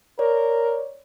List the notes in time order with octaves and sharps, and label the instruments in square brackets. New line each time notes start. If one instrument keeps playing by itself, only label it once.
[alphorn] A#4 [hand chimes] C#5 D5